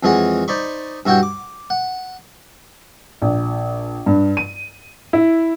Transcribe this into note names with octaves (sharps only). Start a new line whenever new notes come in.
F2 E3 G#3 G#4 C#5 F#5
D#4 C5 D5 B5 C#6
G2 E4 F#4 C#5 F#5 G5
D6
F#5
A#1
G2
D#7
E4